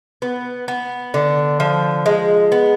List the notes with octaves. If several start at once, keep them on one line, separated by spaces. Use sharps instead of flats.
B3
B3
D3
F3
G#3
B3